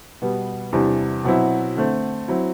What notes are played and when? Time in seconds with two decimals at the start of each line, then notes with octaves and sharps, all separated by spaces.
0.22 B2 G3 B3
0.73 E2 C3 E3 G3 D4
1.24 B2 F#3 C4 E4
1.76 D3 A3 C4
2.28 F#3 C4 E4